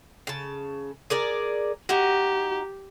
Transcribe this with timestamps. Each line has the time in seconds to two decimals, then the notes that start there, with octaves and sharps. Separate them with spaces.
0.27 C#3 A5
1.10 G#4 A#4 D5
1.89 D#4 F#4 G4